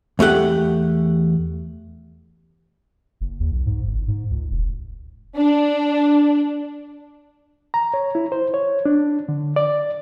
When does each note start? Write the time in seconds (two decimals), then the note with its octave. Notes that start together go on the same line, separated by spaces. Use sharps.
0.19 E2 A3 G4 F#5
3.21 F#1
3.40 D#2
3.52 B1
3.66 G#2
3.86 G1
4.08 G#2
4.30 C#2
4.51 E1
5.37 D4
7.74 A#5
7.94 C#5
8.15 E4
8.32 C5
8.54 C#5
8.85 D4
9.29 D3
9.56 D5